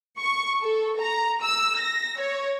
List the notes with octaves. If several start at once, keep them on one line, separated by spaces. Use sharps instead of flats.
C#6
A4
A#5
E6
A#6
C#5